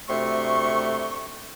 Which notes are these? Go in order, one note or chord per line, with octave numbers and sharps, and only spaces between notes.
D2 C3 A3 C6 C#6